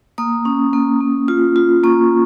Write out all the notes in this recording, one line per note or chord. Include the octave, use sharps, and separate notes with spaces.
A#3 D#6
C#4
A#3
A#3
F4
F4
A#3 C#6